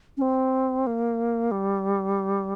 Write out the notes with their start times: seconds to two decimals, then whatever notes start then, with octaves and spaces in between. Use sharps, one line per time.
0.17 C#4
0.22 C4
0.87 A#3
1.51 G3